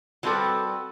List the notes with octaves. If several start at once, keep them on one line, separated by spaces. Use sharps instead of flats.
F#3 G3 C4 F#4 A4 B4